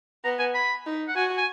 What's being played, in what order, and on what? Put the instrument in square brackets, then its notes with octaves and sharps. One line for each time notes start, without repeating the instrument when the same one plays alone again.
[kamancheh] B3 [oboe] A#5
[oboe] G#5
B5
[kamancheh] D#4
[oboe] F#5
[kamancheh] F#4 [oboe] G#5
[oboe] G#5